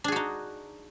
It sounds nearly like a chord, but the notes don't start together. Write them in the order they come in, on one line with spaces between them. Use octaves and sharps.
D4 G#4 F#4 D#4